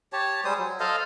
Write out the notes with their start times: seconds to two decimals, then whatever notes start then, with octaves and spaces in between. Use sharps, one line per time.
0.13 G4 C#5 A5
0.45 G3 G#3 C5 D#6
0.58 F#3
0.80 A4 C5 D#5 F5